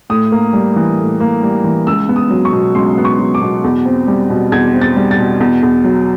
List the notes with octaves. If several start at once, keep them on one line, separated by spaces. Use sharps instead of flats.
A2 D#6
A#3
G3
E3
A2
A#3
G3
E3
C#2 E6
B3
D#6
F#3
C#6
B2
C#2 C6
B3
C#6
F#3
D6
B2
E2
C4
G3
B2
E2 G#6
C4
A6
G3
A6
B2
E2
E2
F#3